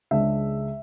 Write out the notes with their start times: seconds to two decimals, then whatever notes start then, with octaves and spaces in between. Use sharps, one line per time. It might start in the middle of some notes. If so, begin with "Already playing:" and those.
0.11 C#2 C#3 G#3 D4 E5